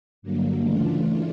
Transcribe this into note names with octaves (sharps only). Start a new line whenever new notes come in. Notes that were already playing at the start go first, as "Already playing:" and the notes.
G2 D3 F#3 A#3
C#3 E3 A3 D4 F4